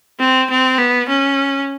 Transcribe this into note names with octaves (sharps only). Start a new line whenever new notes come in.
C4
C4
B3
C#4